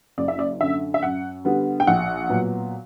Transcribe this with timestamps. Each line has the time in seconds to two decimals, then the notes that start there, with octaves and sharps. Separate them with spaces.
0.18 F#1 D5
0.28 E5
0.39 D5
0.61 F#2 D3 E5
0.94 E5
1.03 F#2 F#5
1.45 D3 G3 B3
1.80 G5
1.87 A#1 F#5
2.30 A#2 F#3 B3